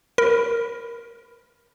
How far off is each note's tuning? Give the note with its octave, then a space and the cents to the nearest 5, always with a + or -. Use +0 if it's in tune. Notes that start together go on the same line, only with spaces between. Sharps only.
A#4 +0 B5 +0